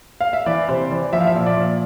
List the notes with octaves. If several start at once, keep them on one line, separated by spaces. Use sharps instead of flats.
F5
E5
E3 D5
C3 C5
E3 D5
F3 E5
F5
E5
A#2
D5
F3